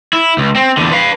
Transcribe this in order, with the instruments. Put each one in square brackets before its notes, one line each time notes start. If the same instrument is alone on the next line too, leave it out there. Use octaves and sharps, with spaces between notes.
[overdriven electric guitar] E4
C#2
C4
E2 D3
B4 F5